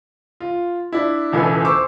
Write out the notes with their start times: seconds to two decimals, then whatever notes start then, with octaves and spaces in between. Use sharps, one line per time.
0.40 F4
0.92 D4 E4
1.32 E1 C#2 E3 E4 A4 G#5
1.65 C5 C#6 D6 E6